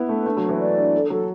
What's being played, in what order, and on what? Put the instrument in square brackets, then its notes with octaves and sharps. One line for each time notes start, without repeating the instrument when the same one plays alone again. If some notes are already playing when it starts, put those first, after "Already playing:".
Already playing: [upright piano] B3 E4 [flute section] B4
[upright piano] A3 [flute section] D4
[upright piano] A3 [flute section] D4
[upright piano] F#3
[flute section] B4
[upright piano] E3
[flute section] D5
D4
A4
[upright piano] F#3 [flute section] A4